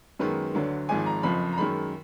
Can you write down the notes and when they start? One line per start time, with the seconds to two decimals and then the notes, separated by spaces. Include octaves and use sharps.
0.19 F#2 D#3 G#3 B3 B4
0.55 D2 D3 F#3
0.89 G#1 G#2 F3 G#5
1.06 A#5
1.23 F#1 F2 F3 B5
1.53 A#5
1.58 F#2 D#3 G#3 B5